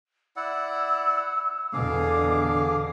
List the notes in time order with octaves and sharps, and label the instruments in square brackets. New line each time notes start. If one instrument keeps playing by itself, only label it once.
[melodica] E4 D5 F#5 [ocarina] E6
[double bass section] E2 B2 D3 [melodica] G#4 F5 [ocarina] D6